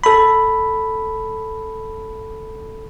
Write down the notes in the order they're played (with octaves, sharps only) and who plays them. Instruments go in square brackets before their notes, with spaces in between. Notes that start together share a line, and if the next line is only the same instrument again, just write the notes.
[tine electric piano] A4 B5